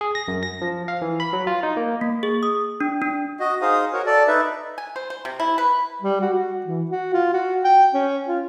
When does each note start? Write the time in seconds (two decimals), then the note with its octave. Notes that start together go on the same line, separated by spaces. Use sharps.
0.01 G#4
0.15 A#6
0.28 F#2
0.43 A#6
0.61 F3
0.88 F5
1.02 E3
1.20 B5
1.33 F#3
1.47 F4
1.63 D#4
1.77 A#3
2.01 A#3
2.23 G#4
2.43 D#6
2.80 D4
3.02 D4
3.40 F#4 D#5
3.62 D#4 G#4 C5 F5 D#6
3.93 F#4 A#4 C#5
4.06 A4 D5
4.28 D#4 B4 E5
4.78 G#5
4.96 C5
5.10 C5
5.25 C3
5.40 E4
5.58 B4
6.02 G3
6.21 F#4
6.33 F#4
6.66 E3
6.91 F#4
7.13 F4
7.33 F#4
7.64 G5
7.94 C#4
8.28 F4